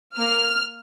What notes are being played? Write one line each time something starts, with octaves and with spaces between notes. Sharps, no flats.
A#3 F6